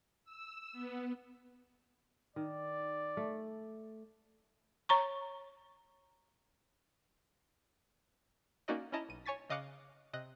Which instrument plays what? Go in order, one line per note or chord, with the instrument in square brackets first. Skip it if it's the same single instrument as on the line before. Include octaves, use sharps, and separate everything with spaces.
[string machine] E6
B3
[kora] D#3 [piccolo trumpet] D5
[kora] A3
[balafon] C#5 A#5 C#6
[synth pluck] A#3 C#4 D#4 F#4 D5 D#5
C#4 E4 D#5 A5 A#5
B1 D#7
C#5 G#5 C#6 A6 B6
C#3 D#5 F5 D6 F#6 C#7
C3 D#5 D#6 F#6 A#6